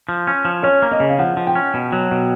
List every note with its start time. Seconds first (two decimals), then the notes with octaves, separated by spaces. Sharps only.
0.09 F3
0.27 C#4
0.45 F3
0.63 C#4 C#5
0.82 A#3
0.92 D#5
1.00 C#3
1.09 F5
1.19 F3 F#5
1.37 F3
1.47 G5
1.55 C#4
1.74 B2
1.92 F#3
2.11 B2